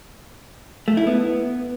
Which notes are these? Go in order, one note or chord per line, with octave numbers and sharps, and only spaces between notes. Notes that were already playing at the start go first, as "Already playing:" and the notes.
A3
E4
B3